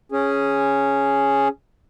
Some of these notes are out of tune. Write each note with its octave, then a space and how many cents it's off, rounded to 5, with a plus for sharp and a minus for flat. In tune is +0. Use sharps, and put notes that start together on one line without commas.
C#4 +0 G#4 +0